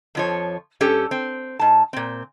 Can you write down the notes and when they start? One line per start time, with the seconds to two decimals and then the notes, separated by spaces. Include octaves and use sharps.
0.15 F2 F3 C#5
0.81 G2 C#4 G4 A4
1.11 C4
1.59 G#2 A5
1.93 A#2 C4